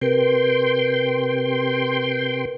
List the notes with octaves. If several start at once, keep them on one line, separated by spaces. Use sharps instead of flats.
C3 A#4 B4 G5 C6